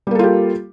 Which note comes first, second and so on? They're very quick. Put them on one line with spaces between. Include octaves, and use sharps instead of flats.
G3 A#3 A4 F4 G4